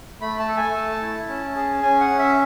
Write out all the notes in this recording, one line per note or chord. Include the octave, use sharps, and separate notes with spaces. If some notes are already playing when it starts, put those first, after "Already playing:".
A3 B5
A5
A4
G#5
A3 A5
E4
C#4
G#4
C#4 G#5
F#5
C#4
E5